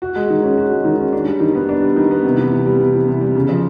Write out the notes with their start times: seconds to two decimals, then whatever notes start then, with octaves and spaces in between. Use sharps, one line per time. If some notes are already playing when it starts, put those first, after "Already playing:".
0.02 F#4
0.16 G#3
0.30 D#3
0.43 C#4
0.58 F#4
0.72 G#3
0.85 D#3
0.99 C#4
1.12 D4
1.27 G3
1.40 D#3
1.55 B3
1.69 D4
1.82 G3
1.96 D#3
2.11 B3
2.25 C3
2.38 E3
2.52 C3
2.66 G3
2.80 C3
2.94 E3
3.07 C3
3.21 G3
3.35 C#3
3.49 F3